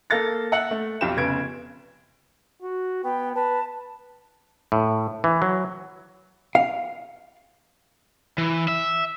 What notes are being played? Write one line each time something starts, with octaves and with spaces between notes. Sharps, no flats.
A#3 A4 F5 A6 A#6
E5 F#5 F#6 C#7 F#7
A3
B1 F2 F4 G4 E7
F1 C#3 B3 G#6 D7
F#4
B3 G5
B4 A5
A2
E3
F#3
F5
E3
E5